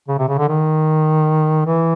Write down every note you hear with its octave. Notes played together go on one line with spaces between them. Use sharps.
C#3
C3
C#3
D3
D#3
E3